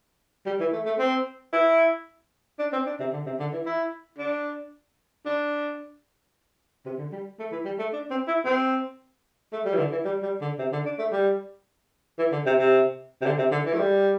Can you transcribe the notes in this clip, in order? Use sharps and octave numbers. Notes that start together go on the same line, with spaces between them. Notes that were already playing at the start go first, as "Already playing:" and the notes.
G3
E3
A3
A3
C4
E4
D4
C4
D4
C3
D3
C3
D3
E3
E4
D4
D4
C3
D3
G3
A3
E3
G3
A3
D4
C4
E4
C4
A3
G3
E3
D3
E3
G3
G3
D3
C3
D3
D4
A3
G3
E3
D3
C3
C3
C3
D3
C3
D3
E3
A3
G3